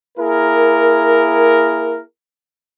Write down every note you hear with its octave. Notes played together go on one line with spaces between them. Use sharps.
A#3 E4 G#4 A#4